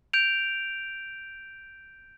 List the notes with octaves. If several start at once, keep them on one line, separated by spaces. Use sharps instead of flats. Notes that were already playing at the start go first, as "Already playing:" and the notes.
G6 D7 F7